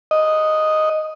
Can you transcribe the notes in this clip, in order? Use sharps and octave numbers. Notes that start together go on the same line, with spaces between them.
D#5